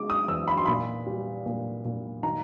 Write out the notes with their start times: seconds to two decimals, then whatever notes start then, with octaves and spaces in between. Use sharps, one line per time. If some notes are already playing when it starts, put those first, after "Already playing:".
Already playing: C#3 G#3 D6
0.10 D#6
0.28 E2 E6
0.48 B5
0.57 C6
0.66 A#2 B5
1.07 G3
1.46 A#2
1.85 A#2
2.23 D#3 A#5